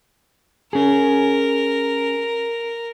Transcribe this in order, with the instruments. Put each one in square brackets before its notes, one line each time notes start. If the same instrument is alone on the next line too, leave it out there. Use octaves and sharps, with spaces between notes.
[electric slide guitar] C#4 G#4 [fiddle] A#4